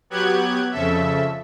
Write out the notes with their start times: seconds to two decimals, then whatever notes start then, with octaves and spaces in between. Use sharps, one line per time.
0.10 F#3 B3 G4 F#6 G#6
0.72 F2 C#3 A4 E5